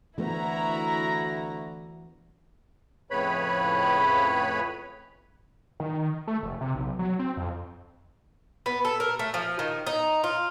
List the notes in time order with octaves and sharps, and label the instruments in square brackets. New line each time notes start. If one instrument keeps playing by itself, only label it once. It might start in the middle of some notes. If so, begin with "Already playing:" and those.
[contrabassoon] D2 [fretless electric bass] E3 A3 B3 [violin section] E4 F#4 A#5
[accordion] F2 A2 C#3 B4 C#5 B5
[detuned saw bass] D#3
A3
F1
C3
B1
F#3
C4
F2
[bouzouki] B3
A4
A#4
A3
F3
D#3
D#4
F4